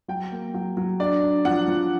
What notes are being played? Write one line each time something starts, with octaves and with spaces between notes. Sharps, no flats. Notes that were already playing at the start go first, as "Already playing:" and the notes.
F#3 G5
A#3
F#3
F#3
D4 D5
D4
F3 F#5
F3